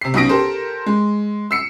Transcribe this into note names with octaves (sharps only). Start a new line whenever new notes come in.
C3 C7
B1 B2 C#4 D#6 A#6 D7
G4 A4 A#4 C5
G#3
E6 C7 C#7